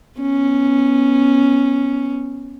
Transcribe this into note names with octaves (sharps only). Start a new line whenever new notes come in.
B3 C#4